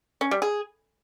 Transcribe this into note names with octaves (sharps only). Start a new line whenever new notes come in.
C#4
G3
G#4